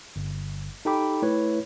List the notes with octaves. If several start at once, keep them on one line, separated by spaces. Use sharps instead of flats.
G1
D#4 G4 A4 G5 B5 D6
A3 E4 B4 C#5